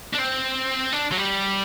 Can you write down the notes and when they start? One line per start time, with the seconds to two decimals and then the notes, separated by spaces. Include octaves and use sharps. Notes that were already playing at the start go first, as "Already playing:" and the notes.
0.13 D4
0.18 C4
0.93 D4
1.11 F#3
1.17 G3